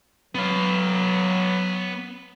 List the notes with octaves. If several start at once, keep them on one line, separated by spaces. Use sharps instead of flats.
F#3 B3 F5